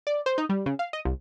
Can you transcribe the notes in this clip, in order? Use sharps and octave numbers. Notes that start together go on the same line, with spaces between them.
D5
C5
D#4
G3
C#3
F5
D#5
C2